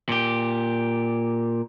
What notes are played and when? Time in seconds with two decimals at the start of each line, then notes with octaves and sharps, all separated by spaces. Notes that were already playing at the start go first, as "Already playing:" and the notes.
0.09 A#2 G4